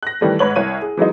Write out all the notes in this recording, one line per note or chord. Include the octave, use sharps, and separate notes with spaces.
F#6 A#6
D#3 E3 G3 A3
G#2 B4 C#5 F#7
C2 C#5 D#7
G#4
E3 F#3 G#3 D#4